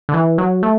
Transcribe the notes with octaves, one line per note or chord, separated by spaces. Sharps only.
D3
E3
F#3
A3